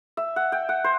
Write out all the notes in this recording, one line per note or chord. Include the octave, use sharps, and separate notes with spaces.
E5
F#5
G5
F#5
C5